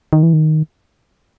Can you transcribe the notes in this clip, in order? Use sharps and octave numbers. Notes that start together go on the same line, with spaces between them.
D#3
E3
D#3